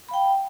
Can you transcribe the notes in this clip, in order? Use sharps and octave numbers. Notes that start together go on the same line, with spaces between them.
F5 G5 B5